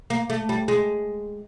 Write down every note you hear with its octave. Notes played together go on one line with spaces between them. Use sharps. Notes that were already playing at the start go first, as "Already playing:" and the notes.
A#3
A3
G3
G#3